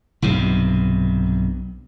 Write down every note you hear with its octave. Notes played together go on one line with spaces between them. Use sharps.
B1 G2 C3